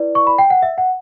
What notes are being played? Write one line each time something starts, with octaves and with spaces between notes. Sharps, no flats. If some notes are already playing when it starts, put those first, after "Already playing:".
Already playing: E4 B4 D5
C#6
B5
G5
F#5
E5
F#5